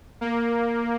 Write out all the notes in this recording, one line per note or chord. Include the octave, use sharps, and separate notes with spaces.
A#3